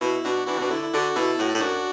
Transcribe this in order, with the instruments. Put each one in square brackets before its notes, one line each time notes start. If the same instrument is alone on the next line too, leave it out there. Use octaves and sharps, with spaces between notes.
[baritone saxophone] B2 [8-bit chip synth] E4
[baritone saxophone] B2 [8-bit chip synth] D4 F#4
[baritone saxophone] E3 [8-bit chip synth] D4 F#4
[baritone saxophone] B2 [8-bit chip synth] D4
[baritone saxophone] D3 [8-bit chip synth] E4
[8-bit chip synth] E4
[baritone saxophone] D3 [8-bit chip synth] D4 F#4
[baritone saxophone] B2 [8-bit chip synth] E4 A4
[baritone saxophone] A2 [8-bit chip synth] F#4
[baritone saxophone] A2 [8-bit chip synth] A4
[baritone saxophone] F#2 [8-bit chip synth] D4 F#4